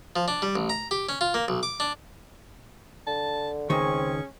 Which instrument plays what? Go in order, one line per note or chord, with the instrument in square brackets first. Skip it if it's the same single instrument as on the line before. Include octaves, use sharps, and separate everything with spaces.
[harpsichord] F3
D4
G3
A1
A#5
G4
C#4
F4
A#3
B1
D6
D4
[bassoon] D3 [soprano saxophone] A5
[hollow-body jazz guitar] C#2 D#3 [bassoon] C4 [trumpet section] C#4 G#4 [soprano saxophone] C#6